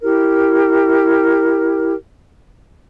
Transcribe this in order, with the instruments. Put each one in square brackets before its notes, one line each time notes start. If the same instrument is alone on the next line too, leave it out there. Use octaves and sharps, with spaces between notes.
[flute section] E4 G4 A#4